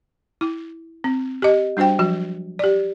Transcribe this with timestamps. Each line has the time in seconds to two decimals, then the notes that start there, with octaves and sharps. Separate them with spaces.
0.41 E4
1.04 C4
1.42 G4 D#5
1.77 G3 D4 F#4 C5 G5
1.99 F3 F#3 F#4
2.59 G4 D5